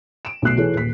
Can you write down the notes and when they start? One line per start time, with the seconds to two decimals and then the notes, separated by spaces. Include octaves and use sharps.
0.25 D7 E7
0.42 B1 A3 F#6 C7
0.57 E3 G#4 A4 C#5
0.74 D#1 B6